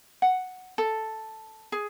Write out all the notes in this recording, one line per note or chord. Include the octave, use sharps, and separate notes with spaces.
F#5
A4
G#4